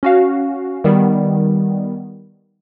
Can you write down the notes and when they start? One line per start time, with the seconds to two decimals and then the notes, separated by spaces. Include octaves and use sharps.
0.03 C#4 F#4 F5
0.84 D#3 G3 B3